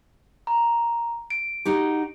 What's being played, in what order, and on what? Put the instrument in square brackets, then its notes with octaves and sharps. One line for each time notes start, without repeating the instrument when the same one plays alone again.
[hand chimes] A#5
D7
[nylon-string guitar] D#4 F#4 G4